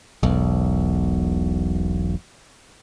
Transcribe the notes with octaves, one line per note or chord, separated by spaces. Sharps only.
E1 B1